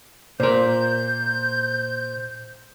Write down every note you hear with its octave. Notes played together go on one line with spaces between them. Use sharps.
A#2 A#4 C5 C6 G6